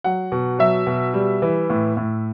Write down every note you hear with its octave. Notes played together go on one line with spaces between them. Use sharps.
F#3 F#5
B2
F#3 E5
B2
G3
E3
A2
A2